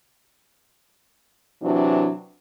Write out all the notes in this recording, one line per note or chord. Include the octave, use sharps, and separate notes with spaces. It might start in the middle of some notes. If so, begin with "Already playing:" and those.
C3 E3 F#3 D4